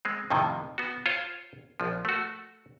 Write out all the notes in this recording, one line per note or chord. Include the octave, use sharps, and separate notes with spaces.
G#3 C4
F2 A2 C3 D#3 F3
B3 F#4
F4 C5 C#5
A#1 F3
A3 F#4